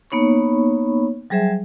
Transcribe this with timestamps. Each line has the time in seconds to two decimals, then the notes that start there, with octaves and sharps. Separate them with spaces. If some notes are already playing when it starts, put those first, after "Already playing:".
0.10 A#3 B3 D#4 C#5 B5 C#6
1.30 F#3 G3 G#4 C5 E5 G#5